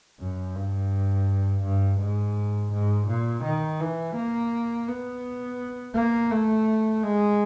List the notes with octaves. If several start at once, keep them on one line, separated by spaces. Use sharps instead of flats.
F#2
G2
G2
G#2
G#2
A#2
D#3
E3
A#3
B3
A#3
A3
G#3